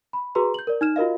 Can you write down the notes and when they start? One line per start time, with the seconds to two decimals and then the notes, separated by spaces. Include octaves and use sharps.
0.13 B5
0.35 F#4 G#4 B4 A#5 C6
0.54 G6 F#7
0.67 A#4 D5
0.81 D#4 F6 E7
0.96 F4 F#4 A#4 D#5 F5